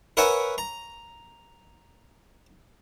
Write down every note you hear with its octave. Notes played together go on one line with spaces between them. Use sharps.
A#4 B4 C#5 E5 F#5 G#5
A#5